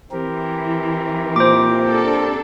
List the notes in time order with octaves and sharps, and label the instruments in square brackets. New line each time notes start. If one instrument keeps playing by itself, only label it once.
[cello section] E3 [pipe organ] C4 G4 A#4
[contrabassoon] A#2 [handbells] C5 D6
[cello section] D4 A4